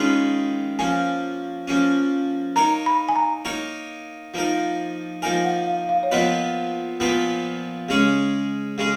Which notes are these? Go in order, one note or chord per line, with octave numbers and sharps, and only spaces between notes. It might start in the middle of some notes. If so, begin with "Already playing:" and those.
Already playing: D#3 G#3 C#4 F4 B4
F3 A#3 C#4 G#5
F3 A#3 C#4
A#3 D#4 A#4 C#5 A#5
B5
G#5
A#5
A#3 D#4 A#4 C#5
F3 A#3 D#4 A#4
F3 A#3 D#4 A#4 G#5
F#5
F5
F5
C#5
A#2 F3 B3 F4 B4 D#5
A#2 F3 B3 F4 B4
C#3 G#3 C#4 G#4 C#5
C#3 G#3 C#4 G#4